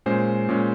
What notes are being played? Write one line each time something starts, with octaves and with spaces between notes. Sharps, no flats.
A#2 G#3 C#4 C5
A#2 G#3 C#4